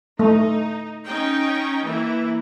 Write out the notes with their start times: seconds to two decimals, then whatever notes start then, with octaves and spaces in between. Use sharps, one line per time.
0.19 A3 D#4
1.04 C#4 D#4 G5
1.84 E3 A#3 E4